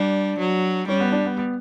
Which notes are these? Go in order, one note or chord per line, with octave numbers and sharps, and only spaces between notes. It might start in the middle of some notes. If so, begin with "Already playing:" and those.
Already playing: G3 D4
F#3
G3 C#4
B3
D4
B3
B3